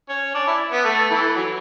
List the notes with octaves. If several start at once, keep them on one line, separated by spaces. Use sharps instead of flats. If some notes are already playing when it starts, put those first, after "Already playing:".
C#4
D4
E4
B3
A3
E3
F#3